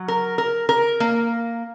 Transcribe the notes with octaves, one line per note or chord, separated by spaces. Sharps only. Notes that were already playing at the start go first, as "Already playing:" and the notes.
Already playing: F#3
A#4
A#4
A#4
A#3